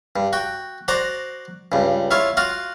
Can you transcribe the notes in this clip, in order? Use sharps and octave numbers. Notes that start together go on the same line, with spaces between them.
G2
F#4 G5
F#4 C5 D5 A#5
C#2 G2
E4 F4 C#5 F5
F4 F#4 F5 F#5